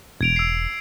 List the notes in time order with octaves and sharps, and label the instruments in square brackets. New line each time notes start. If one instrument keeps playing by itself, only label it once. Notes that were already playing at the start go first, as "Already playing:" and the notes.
[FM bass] E1 [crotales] G#6 D7 F7
[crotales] E6 C7